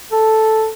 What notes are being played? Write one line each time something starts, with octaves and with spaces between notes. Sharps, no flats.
A4